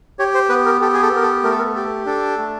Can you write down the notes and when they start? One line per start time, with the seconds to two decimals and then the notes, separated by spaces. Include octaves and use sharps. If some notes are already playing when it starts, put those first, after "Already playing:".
0.19 G4 C#5
0.34 C5
0.49 B3 B4
0.66 A#4
0.81 G4 A4
0.94 G#4
1.02 A4
1.13 B3 A#4
1.22 A4
1.43 A3 A#4
1.52 A4
1.58 A#4
1.75 G4 A4
2.06 D4 A4
2.38 A3